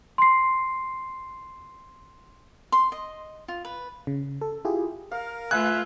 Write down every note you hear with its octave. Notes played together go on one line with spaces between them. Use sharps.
C6 C7
C6
D#5
F4
B4
C#3
A4
E4 F4 G4 G#4
A#4 F5
A3 F4 B4 E5 F5 G#5 F#6